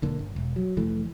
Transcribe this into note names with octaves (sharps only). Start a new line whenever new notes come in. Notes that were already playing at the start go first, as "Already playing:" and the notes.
E1 D3 A#3
G1
E1
F#3
F1 E3 A3